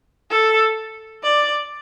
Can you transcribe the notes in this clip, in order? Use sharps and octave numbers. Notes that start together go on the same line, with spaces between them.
A4
D5